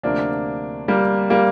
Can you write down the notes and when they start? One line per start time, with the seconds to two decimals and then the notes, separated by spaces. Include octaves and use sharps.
0.03 D2 C3 F3 A#3 D4
0.88 G3 A#3
1.30 G3 A#3